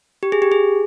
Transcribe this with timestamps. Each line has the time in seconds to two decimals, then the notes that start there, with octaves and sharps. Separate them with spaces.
0.23 G4
0.32 G#4
0.42 G4
0.52 G#4